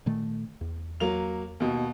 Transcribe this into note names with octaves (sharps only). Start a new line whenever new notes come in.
A#2 D#3 A3
E2
F#3 A#3 F7
D#2 B2